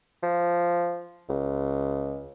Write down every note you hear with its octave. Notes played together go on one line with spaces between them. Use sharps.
F3
C#2